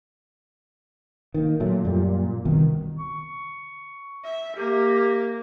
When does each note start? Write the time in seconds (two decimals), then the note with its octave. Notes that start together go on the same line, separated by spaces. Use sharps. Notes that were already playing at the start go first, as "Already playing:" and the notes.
1.34 D#3 A#3
1.60 A#2 F#3 A3
1.85 F#2 G3
2.45 C2 B2 D#3
2.98 C#6
4.24 E5
4.56 A#3 G4